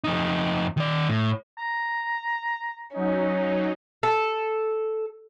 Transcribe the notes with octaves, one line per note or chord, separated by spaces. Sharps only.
F2 D#4
D#3 D5
A2
A#5
F#3 C#4 D#4
A4